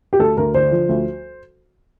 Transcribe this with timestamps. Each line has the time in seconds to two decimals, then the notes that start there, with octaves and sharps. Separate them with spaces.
0.13 G4
0.19 D2 A4
0.37 D2 A#4
0.54 D3 C5
0.72 F3
0.89 D2